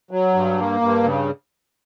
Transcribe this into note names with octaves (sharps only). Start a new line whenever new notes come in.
F#3
G2
A#3
G2
C#3